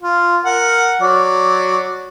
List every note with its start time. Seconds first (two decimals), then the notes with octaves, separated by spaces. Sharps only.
0.02 F4
0.45 A#4 F#5
1.01 F#3 D5